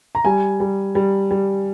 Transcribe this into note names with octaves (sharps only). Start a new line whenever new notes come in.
A#5
G3 G#5
G3
G3
G3